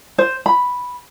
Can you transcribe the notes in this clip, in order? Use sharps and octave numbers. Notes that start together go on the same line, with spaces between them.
C5
B5